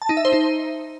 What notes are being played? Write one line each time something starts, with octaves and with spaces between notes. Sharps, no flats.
A5
D#4
E5
C5
D#4